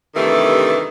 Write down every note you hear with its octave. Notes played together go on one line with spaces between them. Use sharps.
G2 C3 D#3 E3 A3